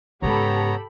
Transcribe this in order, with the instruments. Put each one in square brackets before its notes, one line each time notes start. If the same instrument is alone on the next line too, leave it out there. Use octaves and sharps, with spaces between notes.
[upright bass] G#2 C#3 [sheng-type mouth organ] B3 C#5 A#5 [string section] G4 A4 B5